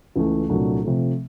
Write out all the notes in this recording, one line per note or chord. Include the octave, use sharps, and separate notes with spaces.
C#2 C#3 E3 A3
C2 A#2 F#3 A3 D4
C3 F3 A3